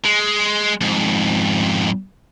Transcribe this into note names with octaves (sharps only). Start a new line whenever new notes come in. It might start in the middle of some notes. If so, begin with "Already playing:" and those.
G#3
F2 G#2